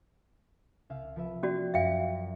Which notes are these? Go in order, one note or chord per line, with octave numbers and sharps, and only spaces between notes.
C2 E5 F5
F3 B4 E5
C#4 F#4 D5
F#2 E5 F5 G5